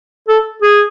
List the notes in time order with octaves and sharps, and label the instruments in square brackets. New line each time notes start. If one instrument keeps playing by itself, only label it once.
[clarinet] A4
G#4